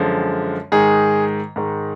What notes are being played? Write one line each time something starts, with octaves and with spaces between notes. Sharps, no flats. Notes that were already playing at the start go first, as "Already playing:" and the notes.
Already playing: F#2 D3 F3 G#3
G#2 D#3 G#3 G#4
G#2 D#3 G#3